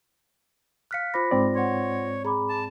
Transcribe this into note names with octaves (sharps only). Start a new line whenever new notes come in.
F5 F6 F#6 B6 C#7
F4 C5 B5 D6 A#6
G#2 C4 D5
C#5 F#5 C6
G#4 A#5 B5 D6
A5